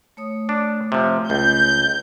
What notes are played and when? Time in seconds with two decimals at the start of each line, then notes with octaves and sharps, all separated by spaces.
0.17 A3 C#5 D#6
0.49 D4
0.92 C3 F3
1.30 C#2 G6